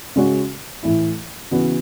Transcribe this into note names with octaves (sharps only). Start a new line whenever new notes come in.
C#3 G#3 C#4 F#4
A2 E3 A3 E4
C#3 E3 B3 F#4